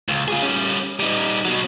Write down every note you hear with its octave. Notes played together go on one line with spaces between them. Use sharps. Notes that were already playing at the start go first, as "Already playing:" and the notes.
C#2
F4 G#4
G3 C#4
G3 D#4
B2 F#3